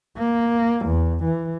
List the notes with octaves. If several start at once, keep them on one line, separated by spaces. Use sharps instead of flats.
A#3
E2
E3